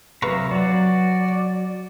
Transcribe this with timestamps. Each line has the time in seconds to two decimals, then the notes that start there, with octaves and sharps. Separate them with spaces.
0.22 C3 F#3 B4 E5 F5 A#5 C#6
0.51 F#3 F#4 D5